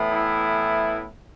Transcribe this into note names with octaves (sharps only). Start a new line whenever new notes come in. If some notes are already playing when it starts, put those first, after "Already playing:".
Already playing: A2 E3 B3
E4